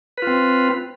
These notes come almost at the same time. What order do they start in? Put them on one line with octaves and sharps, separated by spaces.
B4 F4 C4